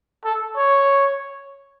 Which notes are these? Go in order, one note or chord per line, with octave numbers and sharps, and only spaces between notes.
A4
C#5